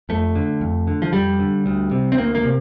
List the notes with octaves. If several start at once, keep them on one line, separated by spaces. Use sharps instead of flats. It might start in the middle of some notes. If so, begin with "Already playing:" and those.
F2 A3
D3
F2
D3
F3
F2 G3
D3
D2
C3
C4
D2 A#3
A#3
C3